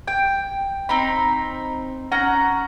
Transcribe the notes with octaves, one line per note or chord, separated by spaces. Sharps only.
G5
C4 D#4 B5
C#4 F#5 A#5